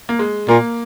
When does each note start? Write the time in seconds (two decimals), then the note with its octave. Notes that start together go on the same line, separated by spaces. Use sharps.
0.09 A#3
0.19 G#3
0.49 A#2 A#3